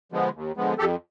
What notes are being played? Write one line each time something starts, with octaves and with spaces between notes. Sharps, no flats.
D3 F3 G#3 B3
D#2
D3 F3 G#3 B3
F2 G4 A4